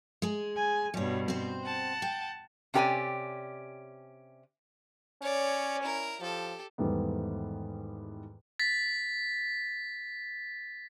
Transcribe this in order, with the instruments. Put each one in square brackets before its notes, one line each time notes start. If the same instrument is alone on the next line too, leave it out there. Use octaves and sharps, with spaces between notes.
[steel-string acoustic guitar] G#3 G#4
[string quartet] G#5
[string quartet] G2 B2 [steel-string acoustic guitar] G3 C#5
[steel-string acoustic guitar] C4 C5
[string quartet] F#5 A5
[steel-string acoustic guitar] G5
[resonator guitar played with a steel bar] C3 C#4 G4 A#4 D5 G#5
[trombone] C#4 [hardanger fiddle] C#5 D5
[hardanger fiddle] E4 A#4
[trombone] F3 [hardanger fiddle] G4 A4
[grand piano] E2 G#2 D#3 G3 A3 B3
[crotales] A6 B6